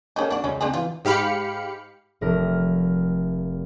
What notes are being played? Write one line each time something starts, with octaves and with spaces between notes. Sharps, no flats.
A#3 C#4 D#4 G#4 A4
D4 F#4 D5
C#2 C#4
C4 D4 G#4
E3 F4
G#2 G4 F5 B5 C#7
F1 A#4